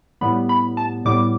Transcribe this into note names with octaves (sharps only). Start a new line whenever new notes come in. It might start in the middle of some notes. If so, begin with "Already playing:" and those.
A2 G3 B3 B5
B5
A5
A2 G3 B3 D6